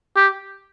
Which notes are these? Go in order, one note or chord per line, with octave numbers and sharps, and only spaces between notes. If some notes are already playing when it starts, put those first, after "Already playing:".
G4